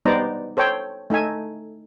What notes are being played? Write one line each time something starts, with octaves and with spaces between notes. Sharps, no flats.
G3 B3 D#4 C5 D5 A#5
A4 C5 C#5 G5
A3 D#4 E5 G#5